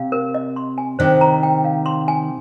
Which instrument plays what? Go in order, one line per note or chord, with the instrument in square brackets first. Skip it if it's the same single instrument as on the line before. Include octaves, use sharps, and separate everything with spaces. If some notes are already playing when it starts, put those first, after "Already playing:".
Already playing: [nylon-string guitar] C3 [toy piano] F5
[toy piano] A#4
D#5
C6
G#5
[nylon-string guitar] C3 D#3 [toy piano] C5
[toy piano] A#5
G5
F5
C6
G#5